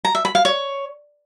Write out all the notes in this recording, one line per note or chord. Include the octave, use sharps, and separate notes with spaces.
A#5
E5
B5
F5
C#5